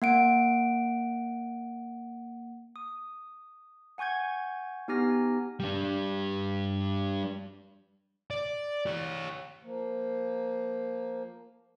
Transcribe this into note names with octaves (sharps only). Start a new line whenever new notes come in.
A#3 F#5 D7
D#6
F#5 G#5 C#6 G6 G#6
B3 D#4 G4 G#5 F6 A#6
G3 D4
D5
G4 C#5
F3 A#3